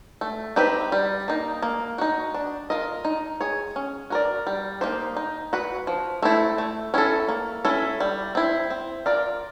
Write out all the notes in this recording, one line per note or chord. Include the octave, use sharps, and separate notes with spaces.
A3
C4 D#4 G4 B4
G3
A#3 D#4
A#3
D#4 F#4
D4
F4 A#4 D#5
D#4
G#4 C#5
C#4
F#4 A#4 D5
G3
A#3 D#4 G4 C5
D#4
F#4 B4
F3
A3 C4 E4 A4
A3
C#4 E4 A4
A#3
C#4 E4 A4
G3
C4 E4
C4
F4 A#4 D5